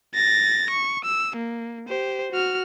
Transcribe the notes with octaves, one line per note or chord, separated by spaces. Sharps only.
A6 A#6
C#6
E6
A#3
G4 C5
F#4 F6